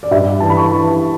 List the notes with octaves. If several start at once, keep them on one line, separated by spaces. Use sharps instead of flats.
D5
G2 E5
E3 A5
B5
C#6
E3